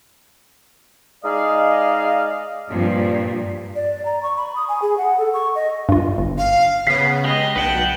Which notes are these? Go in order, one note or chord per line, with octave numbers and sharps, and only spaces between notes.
G#3 D#4 G#4 D5 D#5 F5
G2 A#2 F3
D5
A#5
C#6
B5
D#6
G#5
G#4
F#5
A4
C#6
D#5
G2 F4
G1
F5
C#3 B3 B6 C7
G#3 G4 D#5
B1 B4 F#5 G5 A5